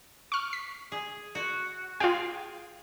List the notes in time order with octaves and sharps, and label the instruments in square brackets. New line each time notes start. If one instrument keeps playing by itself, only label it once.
[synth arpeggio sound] C#6 F6
B6
[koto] G#4
F#4
[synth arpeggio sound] F4 G5 [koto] G#4 F5